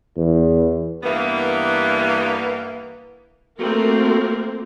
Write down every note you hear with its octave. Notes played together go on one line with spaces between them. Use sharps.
E2
G2 E3 A#3 B3
A3 A#3 C4 F4 F#4 A#4